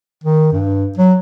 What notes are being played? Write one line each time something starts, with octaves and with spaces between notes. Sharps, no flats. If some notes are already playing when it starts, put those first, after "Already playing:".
D#3
G2
F#3